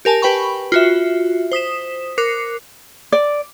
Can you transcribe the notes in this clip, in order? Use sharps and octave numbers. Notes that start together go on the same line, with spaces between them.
G4 A#4 G#5 A5
G4 B4 G5 B5 C#6
F4 F#4 E5
C5 D#6 B6 E7
A#4 D6 F#6 C7 C#7
D5